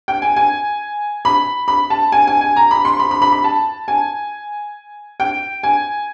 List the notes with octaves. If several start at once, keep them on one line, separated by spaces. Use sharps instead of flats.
G5
G#5
G#5
B5
B5
A5
G#5
G#5
G#5
A#5
B5
C6
B5
B5
B5
B5
A5
G#5
G5
G#5